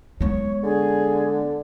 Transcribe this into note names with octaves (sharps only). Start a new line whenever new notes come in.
G#3 B3 C#5
D3 G#4